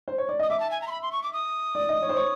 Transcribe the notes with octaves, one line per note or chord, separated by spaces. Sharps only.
C5
C#5
D5
D#5 D#6
E5 D6
A5
G#5
A#5
C6
B5
C6
C#6
D6
D#6
D5
D#5
C#5
C5
C#5